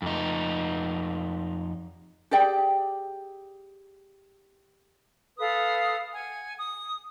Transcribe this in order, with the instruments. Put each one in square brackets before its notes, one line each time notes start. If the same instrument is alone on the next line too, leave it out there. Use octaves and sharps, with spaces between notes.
[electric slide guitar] F2 D#4
[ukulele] G4 G#4 D5 G5
[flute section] A4 B4 F5 D#6
F#5 G#5
D#6